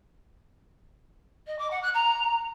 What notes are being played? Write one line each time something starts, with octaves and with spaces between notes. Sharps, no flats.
D#5
D6
F#5
F#6
A#5